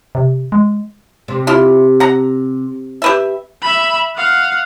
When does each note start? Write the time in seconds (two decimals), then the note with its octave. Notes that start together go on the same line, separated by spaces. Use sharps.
0.15 C3
0.52 G#3
1.28 C3
1.47 E4 F4
2.00 F#5 A#5
3.02 G4 B4 E5
3.62 E5 B5
4.16 F5 F#5